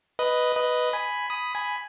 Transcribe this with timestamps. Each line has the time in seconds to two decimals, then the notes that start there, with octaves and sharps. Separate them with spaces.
0.19 B4 D#5
0.56 B4 D#5
0.93 G#5 B5
1.30 B5 D#6
1.55 G#5 B5